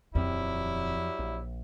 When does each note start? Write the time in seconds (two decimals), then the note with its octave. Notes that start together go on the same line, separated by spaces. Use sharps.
0.15 D#1 F2 F#3 G3 C4 E4
1.19 A#1